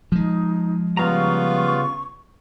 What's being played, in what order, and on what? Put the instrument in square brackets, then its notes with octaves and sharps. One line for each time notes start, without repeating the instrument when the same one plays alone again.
[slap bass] F3 G#3 [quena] D#4
[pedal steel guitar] C#3 F5 A#5 [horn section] G3 B3 F4 [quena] C#6